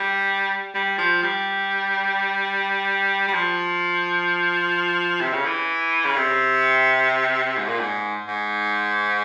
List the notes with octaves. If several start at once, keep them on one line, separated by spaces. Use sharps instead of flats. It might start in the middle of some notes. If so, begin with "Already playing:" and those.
Already playing: G3
G3
F3
G3
G3
F3
C3
C#3
E3
C#3
C3
G#2
A#2
G#2
G#2